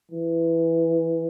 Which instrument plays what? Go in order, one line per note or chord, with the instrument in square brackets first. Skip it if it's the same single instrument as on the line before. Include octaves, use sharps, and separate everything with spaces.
[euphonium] E3